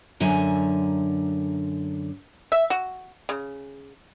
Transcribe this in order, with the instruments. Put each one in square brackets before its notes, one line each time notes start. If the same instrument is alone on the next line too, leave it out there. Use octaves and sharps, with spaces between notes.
[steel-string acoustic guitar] F#2 D3 F#3 E5 G#5 A#5
[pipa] E5
F#4
C#3